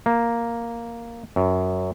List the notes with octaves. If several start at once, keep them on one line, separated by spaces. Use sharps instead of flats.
A#3
F#2